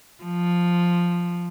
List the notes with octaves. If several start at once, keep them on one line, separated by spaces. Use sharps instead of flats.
F3